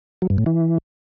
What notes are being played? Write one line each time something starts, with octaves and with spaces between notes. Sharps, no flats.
F#3
G2
A2
E3